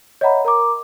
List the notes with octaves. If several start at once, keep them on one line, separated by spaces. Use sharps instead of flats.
C#5 D#5 E5 F#5 A#5 B5
A#4 A#5 D6